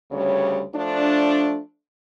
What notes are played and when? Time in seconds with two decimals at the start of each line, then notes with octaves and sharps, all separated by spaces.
0.11 D2 C#3 G3 C#5
0.75 F3 A3 D4